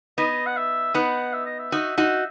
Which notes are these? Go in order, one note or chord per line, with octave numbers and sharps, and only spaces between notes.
B3 D#4 D#5
F#5
E5
B3 D#4 F#5
E5
D#5
E5
D#4 F#4
D#4 F#4